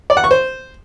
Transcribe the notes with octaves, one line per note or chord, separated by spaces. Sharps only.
D5
F#5
C#6
C5